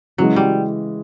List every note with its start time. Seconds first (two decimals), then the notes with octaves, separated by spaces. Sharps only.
0.18 C#3 E3 F#3 G#3
0.36 G3